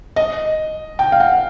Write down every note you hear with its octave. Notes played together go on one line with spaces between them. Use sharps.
D#5
G5
F5
F#5